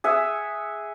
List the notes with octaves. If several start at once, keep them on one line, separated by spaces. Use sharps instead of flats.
G#4 E5 F#5